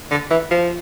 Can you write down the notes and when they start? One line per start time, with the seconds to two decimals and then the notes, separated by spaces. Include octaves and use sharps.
0.11 D3
0.31 E3
0.51 F3